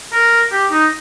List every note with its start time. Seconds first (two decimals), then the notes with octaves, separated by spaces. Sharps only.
0.13 A#4
0.52 G4
0.71 D#4